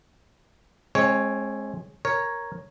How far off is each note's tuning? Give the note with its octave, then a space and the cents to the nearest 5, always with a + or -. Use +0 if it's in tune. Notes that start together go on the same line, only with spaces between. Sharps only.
G#3 +15 C4 +40 C#5 +0
A#4 +0 C#5 +0